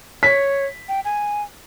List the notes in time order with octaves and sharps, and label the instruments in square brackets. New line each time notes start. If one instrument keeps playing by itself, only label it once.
[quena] C#5 [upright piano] B6
[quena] G5
G#5